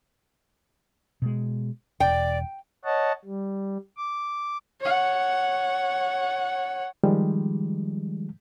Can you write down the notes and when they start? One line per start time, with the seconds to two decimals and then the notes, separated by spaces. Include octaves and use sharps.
1.22 B2 G#3
2.00 E1 D5 G5
2.85 C#5 D#5 F#5 A5
3.25 G3
3.97 D6
4.81 C#5 F#5
7.03 D#3 F3 G3 G#3